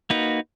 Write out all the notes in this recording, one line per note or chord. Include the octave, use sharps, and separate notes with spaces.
A#3 D#4 F#4 B4